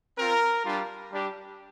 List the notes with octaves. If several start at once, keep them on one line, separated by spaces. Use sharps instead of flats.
C4 F4 A#4
G3 D4 F4
G3 D4 G4